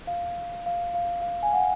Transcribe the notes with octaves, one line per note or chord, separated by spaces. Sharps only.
F5
F5
F5
F5
G#5
F#5